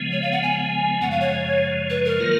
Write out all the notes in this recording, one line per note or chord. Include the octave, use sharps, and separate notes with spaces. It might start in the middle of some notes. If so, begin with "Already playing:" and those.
Already playing: C#3 F3 G#3 B3
C#5
F5
F#5
G#5
F#2 C#3 F3 G#3 F#5
F5
C#5
B4
A#4
D#3 F#3 A#3 F4